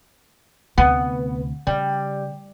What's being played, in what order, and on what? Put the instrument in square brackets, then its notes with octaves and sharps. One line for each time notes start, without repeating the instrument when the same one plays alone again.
[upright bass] D2 C3 [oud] B3
[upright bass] C#3 [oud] G3